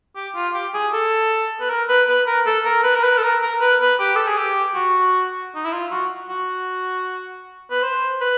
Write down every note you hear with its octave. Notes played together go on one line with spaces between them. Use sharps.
G4
F4
G4
G#4
A4
B4
A#4
B4
B4
A#4
A4
A#4
B4
A#4
B4
A4
A#4
A#4
B4
B4
G4
A4
G#4
G4
F#4
D#4
E4
F4
F#4
F#4
B4
C5
B4